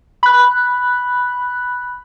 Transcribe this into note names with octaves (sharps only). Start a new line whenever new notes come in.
B5 F#6